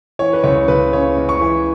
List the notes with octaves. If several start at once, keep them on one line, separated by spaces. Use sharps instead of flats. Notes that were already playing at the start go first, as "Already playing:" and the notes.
E3 C#5
B4
C#2 C#5
C#2 B4
C#3 C#5
C#2
C#6
E3